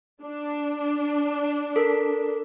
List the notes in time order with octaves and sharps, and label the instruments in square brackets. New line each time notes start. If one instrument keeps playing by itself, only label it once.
[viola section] D4
[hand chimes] A4 A#4